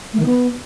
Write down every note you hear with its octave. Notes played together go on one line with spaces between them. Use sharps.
A3
D#3
B3